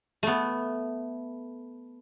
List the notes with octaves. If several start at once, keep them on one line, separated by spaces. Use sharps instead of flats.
A3 B3